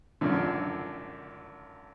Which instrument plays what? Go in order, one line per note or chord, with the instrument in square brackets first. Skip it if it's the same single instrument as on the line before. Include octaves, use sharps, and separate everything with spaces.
[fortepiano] G#1 F#2 D3 F3